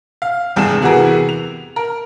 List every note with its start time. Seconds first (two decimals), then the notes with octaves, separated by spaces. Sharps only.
0.22 F5
0.56 G#1 E2 G2 C3 G#4 E7
0.82 C3 E3 B3 F#4 G#4 A#4
1.29 F7
1.76 A#4